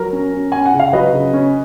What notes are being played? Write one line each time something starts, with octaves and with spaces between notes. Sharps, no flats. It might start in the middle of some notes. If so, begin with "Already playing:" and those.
Already playing: F#3 A#4
C#4
C#4
C#4 G#5
F#5
C#3
F5
F#3 B4 D#5
C#3
C#4